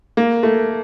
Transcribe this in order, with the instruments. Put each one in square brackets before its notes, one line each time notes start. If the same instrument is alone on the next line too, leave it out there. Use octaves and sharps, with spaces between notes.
[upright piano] A#3
A3